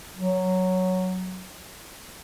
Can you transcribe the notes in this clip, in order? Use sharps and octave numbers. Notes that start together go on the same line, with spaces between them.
F#3